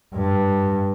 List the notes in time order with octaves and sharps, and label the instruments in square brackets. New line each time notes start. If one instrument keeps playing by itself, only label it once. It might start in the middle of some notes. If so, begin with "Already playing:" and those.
[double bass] G2